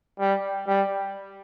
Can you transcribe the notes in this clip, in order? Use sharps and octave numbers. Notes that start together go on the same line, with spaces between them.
G3
G3